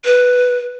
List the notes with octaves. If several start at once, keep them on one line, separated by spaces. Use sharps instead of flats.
B4